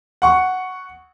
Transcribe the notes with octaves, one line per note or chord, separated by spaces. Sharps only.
F#5 C#6